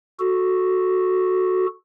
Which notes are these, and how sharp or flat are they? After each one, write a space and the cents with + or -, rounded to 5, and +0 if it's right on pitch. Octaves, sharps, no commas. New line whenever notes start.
F#4 +0 A4 +0